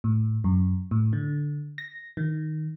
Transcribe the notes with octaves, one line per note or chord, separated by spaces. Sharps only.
A2
F#2
A2
D3
A#6
D#3